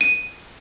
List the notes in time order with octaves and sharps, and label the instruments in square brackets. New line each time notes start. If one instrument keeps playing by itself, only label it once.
[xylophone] D#7